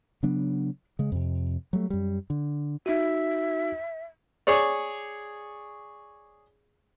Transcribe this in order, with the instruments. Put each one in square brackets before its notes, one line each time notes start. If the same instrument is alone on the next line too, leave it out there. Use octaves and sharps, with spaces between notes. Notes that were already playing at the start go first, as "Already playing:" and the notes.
[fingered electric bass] C#3 F#3 B3 D4
C#3 G#3
F2 C3
F#3 G3 A3
F#2 G3
D3
[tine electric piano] D#4 F#4 [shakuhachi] E5
[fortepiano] G#4 C#5 D5